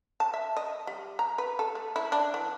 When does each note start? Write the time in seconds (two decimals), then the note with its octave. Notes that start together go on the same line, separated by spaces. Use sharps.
0.20 A5
0.34 E5
0.57 D#5
0.87 G3
1.19 A#5
1.38 B4
1.59 A4
1.75 A3
1.96 E4
2.12 D4
2.34 E3